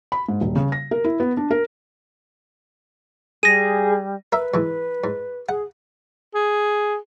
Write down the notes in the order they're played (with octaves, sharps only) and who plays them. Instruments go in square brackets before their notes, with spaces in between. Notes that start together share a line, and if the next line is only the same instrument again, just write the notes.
[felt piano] B5
G#2
D#1
C#3
A#6
A#4
E4
B3
D4
A#4
[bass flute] G3 [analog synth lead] G#4 [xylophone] A#6 D#7
[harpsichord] A#4 E5 [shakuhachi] B4
[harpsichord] G#2 E3
G#2
[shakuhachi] G#4 [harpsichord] F#5
[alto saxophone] G#4